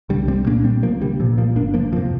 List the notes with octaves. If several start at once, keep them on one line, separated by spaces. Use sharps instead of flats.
C2 D3 G3
G3 C4
A#2 A#3 D4
G3 C4
C2 F3 A#3
D3 G3
A#2 F3
F3 A#3
G1 A#3 D4
F3 A#3
F2 C3 F3